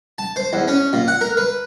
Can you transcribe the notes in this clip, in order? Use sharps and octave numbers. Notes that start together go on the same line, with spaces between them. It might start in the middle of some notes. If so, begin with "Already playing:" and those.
A5
C5
E2
C#4
A#2
F#5
A#4
B4